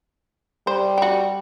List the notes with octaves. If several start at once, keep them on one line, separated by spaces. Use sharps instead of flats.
G3 C5
F#4 G4